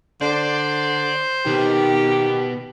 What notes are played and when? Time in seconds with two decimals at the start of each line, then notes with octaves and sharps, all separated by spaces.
0.22 D3 C5 D5
1.46 B2 D#3 G4